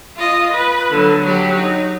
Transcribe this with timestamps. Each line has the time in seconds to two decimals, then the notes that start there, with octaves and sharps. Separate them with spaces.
0.17 F4 D#5
0.52 B4
0.90 D3 F#3
1.22 F#3 G4
1.55 D#4